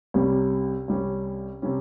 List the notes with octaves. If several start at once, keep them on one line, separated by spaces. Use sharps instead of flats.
C2 C3 G3 C#4
C2 C3 G3 C#4
C3 G3 C#4